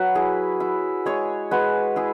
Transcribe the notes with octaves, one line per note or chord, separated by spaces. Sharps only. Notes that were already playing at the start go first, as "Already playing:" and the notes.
Already playing: F#3 F#4 B4 E5
E4 G#4
E4
G#3 G#4 C#5
G#3 F#4 B4
E4 G#4